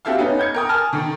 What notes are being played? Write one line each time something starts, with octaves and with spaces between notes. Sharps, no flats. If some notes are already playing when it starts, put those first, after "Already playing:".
C4 F#4 G4 A4 E5 F5
B3 C#4 D#4
G6 G#6 C#7
A#4 G5 D#6
G#5 A5 F6
D#3 A4